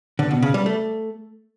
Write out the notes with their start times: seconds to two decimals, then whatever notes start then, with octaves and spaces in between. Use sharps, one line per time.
0.19 D3
0.31 B2
0.42 C#3
0.54 G3
0.66 A3